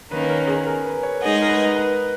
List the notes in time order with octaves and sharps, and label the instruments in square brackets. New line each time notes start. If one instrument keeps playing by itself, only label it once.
[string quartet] D#3 A#3 C#4 [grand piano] B4
[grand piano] A#4
G#4
A#4
B4
C#5
[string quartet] G#3 D#4 G#4 D#5 [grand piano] F#5
[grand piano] A#4
B4
B4